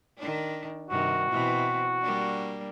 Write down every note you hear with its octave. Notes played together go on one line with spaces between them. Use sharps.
D#3 D4
G2 C3 D#3 F#4
B2 E3 C4
G3 A#3 D4